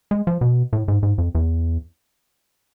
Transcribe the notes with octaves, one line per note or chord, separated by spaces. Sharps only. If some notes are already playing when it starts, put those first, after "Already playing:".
G#3
F3
B2
A2
G#2
G#2
F2
E2